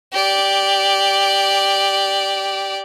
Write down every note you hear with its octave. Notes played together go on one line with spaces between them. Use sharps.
G4 D5